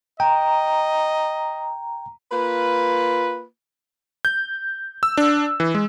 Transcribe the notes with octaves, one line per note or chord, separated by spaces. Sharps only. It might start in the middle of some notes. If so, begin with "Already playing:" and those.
D#5 G5 A#5
A#3 F4 B4
G6
E6
D4
E3
G#3